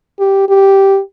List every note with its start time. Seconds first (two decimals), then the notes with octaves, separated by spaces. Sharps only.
0.20 G4
0.49 G4